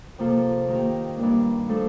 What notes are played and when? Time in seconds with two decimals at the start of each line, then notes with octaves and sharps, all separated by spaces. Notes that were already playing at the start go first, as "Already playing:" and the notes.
0.18 C3 F3 A#3 F4 A4
0.68 D#3 A#3 D#4 G4 A#4
1.18 G2 D#3 A#3 D4
1.68 F3 A3 D4 A4